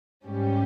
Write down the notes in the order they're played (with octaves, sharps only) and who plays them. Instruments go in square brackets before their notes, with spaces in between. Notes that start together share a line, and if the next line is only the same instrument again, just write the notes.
[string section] G#2 G3 C#4 G4